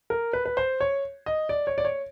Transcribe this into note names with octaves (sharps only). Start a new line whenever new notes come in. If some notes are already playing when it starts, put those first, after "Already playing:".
A#4
B4
B4
C5
C#5
D#5
D5
C#5
D5
C#5